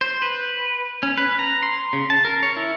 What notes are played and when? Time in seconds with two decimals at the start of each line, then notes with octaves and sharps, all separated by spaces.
0.01 C5
0.22 B4
1.03 C#4
1.18 B4
1.39 A#5
1.63 C6
1.93 C#3
2.10 A5
2.25 A#4
2.43 C#5
2.57 E4